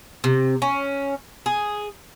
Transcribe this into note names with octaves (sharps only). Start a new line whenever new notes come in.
C3
C#4
G#4